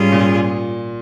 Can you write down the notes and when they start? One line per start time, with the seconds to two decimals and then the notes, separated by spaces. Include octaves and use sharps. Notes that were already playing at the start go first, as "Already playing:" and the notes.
Already playing: G#2 G3 C#4 F4 G#4
0.12 A#2